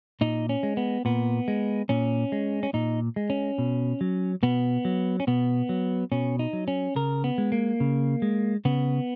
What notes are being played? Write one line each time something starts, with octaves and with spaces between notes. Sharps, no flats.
A#2 D#4
C#4
G#3
B3
A#2 B3
G#3
A#2 C#4
G#3
C#4
A#2 D#4
G#3
C#4
B2
F#3
B2 B3
F#3
C#4
B2 B3
F#3
B2 C#4
D#4
F#3
C#4
C#3 A#4
B3
G#3
A#3
C#3
G#3
C#3 B3